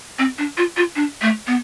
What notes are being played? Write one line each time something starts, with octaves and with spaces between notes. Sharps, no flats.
C4
D4
F4
F4
D4
A3
B3